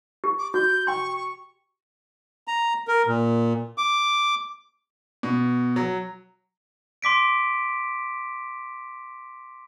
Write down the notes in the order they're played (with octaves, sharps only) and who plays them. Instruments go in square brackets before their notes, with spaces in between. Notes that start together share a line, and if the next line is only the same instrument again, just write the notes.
[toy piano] G4
[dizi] D6
[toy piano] F#4 [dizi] G6
[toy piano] G5 C6 [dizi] C#6
[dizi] C#6
[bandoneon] A#5
A#4
A#2
D6
[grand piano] B2
F#3
[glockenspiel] C6 D6 B6 D7